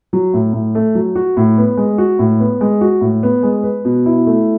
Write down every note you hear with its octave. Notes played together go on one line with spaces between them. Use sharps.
F#3
A2
A2
A3
F#3
F#4
A2
B3
G#3
F#4
A2
B3
G#3
F#4
A2
B3
G#3
B4
B2
E4
A3